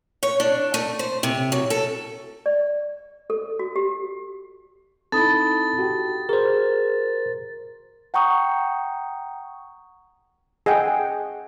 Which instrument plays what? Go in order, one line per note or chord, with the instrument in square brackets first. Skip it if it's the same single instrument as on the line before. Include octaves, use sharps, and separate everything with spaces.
[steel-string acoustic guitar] C#5
D4
A3
C5
C3
F#3
A4
[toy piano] D5
A4
F#4
G4
[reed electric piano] C4 D#4 E4 [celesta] A4 B5 D#6 [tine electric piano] A5 [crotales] A6
[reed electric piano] F#4 G4 G5
[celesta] G#4 [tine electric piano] A#4 C5
[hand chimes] F#5 G5 A#5 C#6 D#6
[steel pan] G#4 D#5 F#5 G5